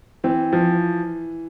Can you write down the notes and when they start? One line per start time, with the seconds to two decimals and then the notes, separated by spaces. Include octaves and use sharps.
0.24 E3 C4
0.53 F3